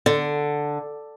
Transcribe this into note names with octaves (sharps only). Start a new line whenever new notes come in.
D3